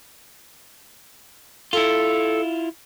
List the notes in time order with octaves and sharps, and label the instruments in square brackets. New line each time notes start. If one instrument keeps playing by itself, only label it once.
[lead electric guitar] E4 F4 [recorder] A4